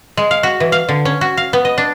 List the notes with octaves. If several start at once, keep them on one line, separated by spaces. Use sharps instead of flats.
G#3
F5
F#4
E3
F5
D3
C#4
F#4
F5
B3
D#5
D4